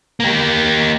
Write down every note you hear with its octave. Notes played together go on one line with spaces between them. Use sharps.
A#3 G4